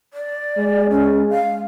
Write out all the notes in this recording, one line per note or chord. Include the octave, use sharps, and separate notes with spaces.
D5
G#3
C#4
F5